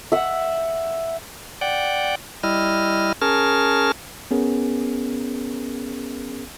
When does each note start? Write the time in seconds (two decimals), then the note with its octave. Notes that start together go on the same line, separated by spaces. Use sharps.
0.12 E5 F#5
1.61 D5 F#5 G5
2.43 G3 E4 D#5 F6
3.21 C#4 G#4 A#4 A5 F6
4.31 B3 C#4 G#4 A#4